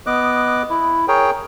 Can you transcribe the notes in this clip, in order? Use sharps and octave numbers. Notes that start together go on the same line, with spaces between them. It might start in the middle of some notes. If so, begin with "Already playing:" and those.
B3 D#5 D6 F#6
E4
G#4 A#4 C#5 G5